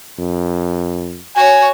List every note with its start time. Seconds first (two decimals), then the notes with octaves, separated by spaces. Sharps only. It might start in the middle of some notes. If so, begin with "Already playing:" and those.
0.19 F2
1.36 F#4 C#5 G#5